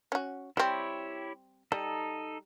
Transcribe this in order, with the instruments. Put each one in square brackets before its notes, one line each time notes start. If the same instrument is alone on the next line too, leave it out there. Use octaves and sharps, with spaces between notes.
[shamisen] C#4 F#4
[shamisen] G3 C4 [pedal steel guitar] E4 G4 C#5
[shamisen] G3 [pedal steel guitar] D#4 A4